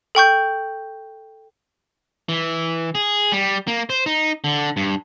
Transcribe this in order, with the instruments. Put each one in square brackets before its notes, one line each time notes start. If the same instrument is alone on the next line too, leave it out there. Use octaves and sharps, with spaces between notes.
[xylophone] A4 G5 C#6 G6
[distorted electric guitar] E3
G#4
G3
A#3
C5
D#4
D3
G2